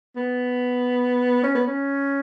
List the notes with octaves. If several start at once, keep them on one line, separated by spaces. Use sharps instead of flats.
B3
C#4
B3
C#4